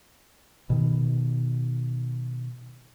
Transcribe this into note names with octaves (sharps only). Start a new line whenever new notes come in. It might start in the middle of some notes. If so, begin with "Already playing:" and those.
B2 D#3